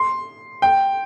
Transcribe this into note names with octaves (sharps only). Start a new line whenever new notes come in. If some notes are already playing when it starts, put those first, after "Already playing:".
Already playing: C6
G5